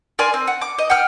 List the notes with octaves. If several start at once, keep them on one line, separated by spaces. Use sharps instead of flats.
A#4 D5 G#5 C6
C4
F#5
D6
D#5
F#5 G5 F6